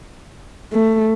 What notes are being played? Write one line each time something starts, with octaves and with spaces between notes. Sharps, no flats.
A3